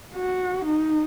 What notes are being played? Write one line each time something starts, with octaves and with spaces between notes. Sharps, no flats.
F#4
D#4